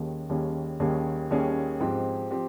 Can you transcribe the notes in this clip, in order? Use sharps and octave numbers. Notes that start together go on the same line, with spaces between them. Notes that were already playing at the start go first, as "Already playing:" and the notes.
Already playing: D#2 D#3 G3 C#4 G#4
D#2 D#3 G3 C#4 G#4
D#2 D#3 G3 C#4 G#4
D#2 D#3 G3 C#4 G#4
G#2 F3 C4 G4
F3 C4 G4